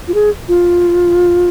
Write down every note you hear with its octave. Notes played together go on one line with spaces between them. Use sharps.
F4
G#4
F4